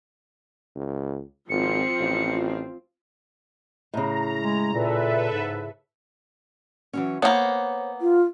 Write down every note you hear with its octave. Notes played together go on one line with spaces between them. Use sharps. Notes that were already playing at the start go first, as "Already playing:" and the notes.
C#2
G#1 F3 C4 F4 C#7
A1
A2 C#3 A#5
G#3
A#2 A4 B4 E5
G#2
E3 F#3 C#4
A#3 B3 C5 C#5
F4